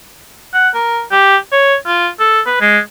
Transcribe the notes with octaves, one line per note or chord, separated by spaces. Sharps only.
F#5
A#4
G4
C#5
F4
A4
B4
G#3